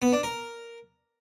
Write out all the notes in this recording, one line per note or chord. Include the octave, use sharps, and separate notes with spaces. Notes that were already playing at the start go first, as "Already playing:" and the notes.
B3
D4
A#4